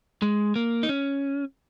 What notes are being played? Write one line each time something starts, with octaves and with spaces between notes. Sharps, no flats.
G#3
A#3
D#4
C#4